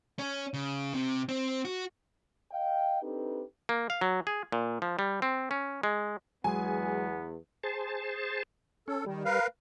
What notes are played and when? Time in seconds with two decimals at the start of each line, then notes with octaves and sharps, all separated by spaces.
0.19 C#4
0.54 C#3
0.94 C3
1.29 C4
1.65 F#4
2.52 D#5 F5 G5
3.03 C4 D4 D#4 G4 A4 B4
3.69 A#3
3.90 F5
4.01 F#3
4.27 G#4
4.52 A#2
4.82 F3
4.99 G3
5.22 C4
5.51 C#4
5.83 G#3
6.44 E2 F#3 G#3 B3 G#4 G#5
7.63 G#4 C5 A5
8.88 C#4 A4
9.06 D#3 G3
9.25 A#4 B4 F5